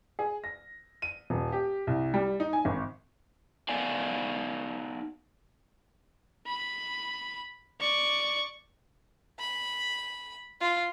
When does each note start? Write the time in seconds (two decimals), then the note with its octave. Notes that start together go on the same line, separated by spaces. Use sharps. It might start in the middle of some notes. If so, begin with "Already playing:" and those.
0.19 G#4
0.44 A#6
1.02 D#7
1.30 D#1
1.52 G4
1.87 C2
2.14 G3
2.40 D#4
2.53 G#5
2.65 G#1
3.69 B3 D#4 D5 F5 G#5
6.47 B5
7.81 D5 C#6
9.39 B5
10.61 F4